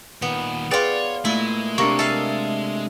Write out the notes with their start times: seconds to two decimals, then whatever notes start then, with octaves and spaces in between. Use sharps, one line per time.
0.22 A#2 D#3 B3
0.71 F4 G#4 B4 C#5 D5 G5
1.25 A#2 G#3 A3 E4
1.78 C3 A#3 D4 C#6 A#6 C#7
1.99 A4 E5 F5